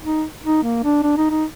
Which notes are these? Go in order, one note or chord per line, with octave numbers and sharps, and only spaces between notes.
D#4
D#4
A#3
D4
D4
D#4
D#4